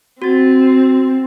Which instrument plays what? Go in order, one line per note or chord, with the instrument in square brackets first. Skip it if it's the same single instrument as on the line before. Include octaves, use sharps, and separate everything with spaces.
[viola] C4 [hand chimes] F#4 A6